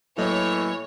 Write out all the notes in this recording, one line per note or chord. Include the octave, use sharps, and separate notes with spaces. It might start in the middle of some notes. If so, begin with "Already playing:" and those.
A2 E3 F#3 A#3 C#5 D#5